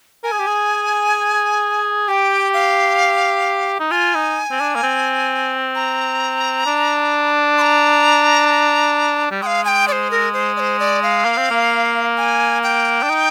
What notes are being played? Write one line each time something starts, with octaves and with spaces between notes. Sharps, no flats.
A#4 G#5
G#4
G4
G#4
G4 G5 G#5
F5
D#4
F4 G#5
D#4
C4
D4
A#3
C4
A#5
D4
C6
A#5
G3
G#3 F5 G5
G#5
G5
D5
C5
A#4
C5
D5
C5
D5
F5
A#3
C4
A#3
G#5
G5
D4
D#4